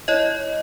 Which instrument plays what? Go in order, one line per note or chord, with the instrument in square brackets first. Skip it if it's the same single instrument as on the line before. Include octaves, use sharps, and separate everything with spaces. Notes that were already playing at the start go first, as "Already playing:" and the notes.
[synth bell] E4 C#5 D#5